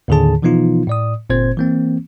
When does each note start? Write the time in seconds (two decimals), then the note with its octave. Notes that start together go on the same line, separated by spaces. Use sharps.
0.08 D#2 A2 D3 D#3 G#4 A5
0.42 B2 E3 F3 B3 D#4 F4
0.87 A2 D5 D#6
1.30 G1 A#2 C4 C5 G#6
1.57 E3 A#3 C4